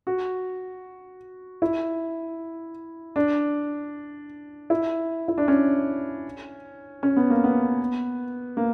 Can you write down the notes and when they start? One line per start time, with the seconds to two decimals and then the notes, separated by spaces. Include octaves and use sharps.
0.07 F#4
1.62 E4
3.16 D4
4.70 E4
5.28 E4
5.38 D4
5.48 C#4
7.03 C#4
7.17 B3
7.30 A#3
7.44 B3
8.57 A#3